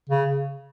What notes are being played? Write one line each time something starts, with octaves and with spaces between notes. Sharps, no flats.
C#3